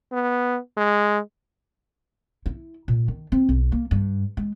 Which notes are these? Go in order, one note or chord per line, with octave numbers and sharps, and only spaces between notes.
B3
G#3
E4
A#2
D#3
C4
B1
A#3
G2
G#3